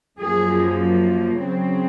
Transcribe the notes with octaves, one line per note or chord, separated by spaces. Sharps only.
F#2 F3 A#3 G#4
C#3 F#3 C4